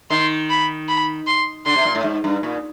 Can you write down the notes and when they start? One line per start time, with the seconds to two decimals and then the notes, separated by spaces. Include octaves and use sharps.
0.10 D#3 C6
0.50 B5
0.88 B5
1.27 C6
1.66 D3 C6
1.76 C3
1.85 A#2
1.95 A2
2.04 G#2
2.24 G2
2.43 A#2